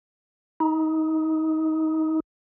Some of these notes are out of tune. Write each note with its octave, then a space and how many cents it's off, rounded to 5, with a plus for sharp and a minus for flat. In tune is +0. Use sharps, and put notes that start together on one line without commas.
D#4 +25